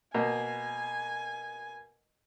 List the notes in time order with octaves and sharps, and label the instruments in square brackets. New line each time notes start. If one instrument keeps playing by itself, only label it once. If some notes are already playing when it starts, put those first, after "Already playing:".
[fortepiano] B2 A#3 [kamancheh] G#5